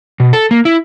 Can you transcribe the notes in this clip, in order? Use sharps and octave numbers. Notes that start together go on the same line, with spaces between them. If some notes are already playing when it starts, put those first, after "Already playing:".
B2
A4
A#3
E4